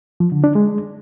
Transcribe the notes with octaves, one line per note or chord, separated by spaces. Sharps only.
F3
D3
D4
G#3